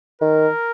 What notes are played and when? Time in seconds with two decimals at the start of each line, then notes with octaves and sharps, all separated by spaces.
0.21 D#3 A#4